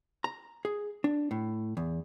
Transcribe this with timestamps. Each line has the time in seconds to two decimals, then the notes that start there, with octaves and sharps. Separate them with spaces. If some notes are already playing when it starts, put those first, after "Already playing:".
0.24 A#5
0.65 G#4
1.04 D4
1.31 A2
1.77 E2